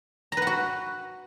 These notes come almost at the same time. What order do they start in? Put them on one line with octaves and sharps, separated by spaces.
A#5 B4 F#5 F#4